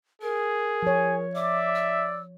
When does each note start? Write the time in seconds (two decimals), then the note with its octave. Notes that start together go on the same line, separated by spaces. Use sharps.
0.22 G#4 A#4
0.83 F3 C#5 G#5
1.35 D5 E5 D6
1.75 E6